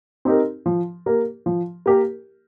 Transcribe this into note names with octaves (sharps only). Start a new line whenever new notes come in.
C4 D#4 G4 A#4
F3
A#3 G4 A#4
F3
A#3 G4 A#4